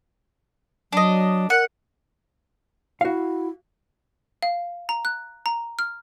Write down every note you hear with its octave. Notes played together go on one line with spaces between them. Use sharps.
F#3 D4 D#5
A#4 F#5
E4 F#4 F5
F5
A#5
F#6
A#5
F6